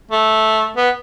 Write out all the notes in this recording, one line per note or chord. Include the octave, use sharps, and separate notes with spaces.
A3
B3